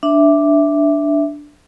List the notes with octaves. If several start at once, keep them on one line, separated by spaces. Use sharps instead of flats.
D4 E5